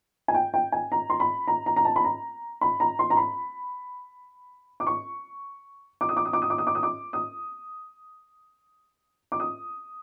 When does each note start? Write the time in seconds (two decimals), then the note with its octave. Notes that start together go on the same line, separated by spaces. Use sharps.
0.28 G#5
0.34 G5
0.54 G5
0.72 G#5
0.92 A#5
1.10 C6
1.20 B5
1.48 A#5
1.66 A#5
1.76 A#5
1.85 A5
1.96 B5
2.04 A#5
2.61 B5
2.80 A#5
2.99 C6
3.10 A#5
3.17 B5
4.80 D6
4.87 C#6
6.01 D6
6.09 D#6
6.17 D6
6.25 D#6
6.33 D6
6.42 D#6
6.50 D6
6.58 D#6
6.67 D6
6.75 D#6
6.83 D6
7.13 D#6
9.32 D6
9.40 D#6